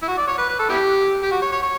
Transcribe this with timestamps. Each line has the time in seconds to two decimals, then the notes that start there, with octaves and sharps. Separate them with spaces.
0.02 E4
0.08 F#4
0.17 D5
0.27 C#5
0.38 B4
0.49 B4
0.59 A4
0.69 B3 E4 G4
1.23 G4
1.31 F#4
1.41 C#5
1.52 C#5
1.62 C#5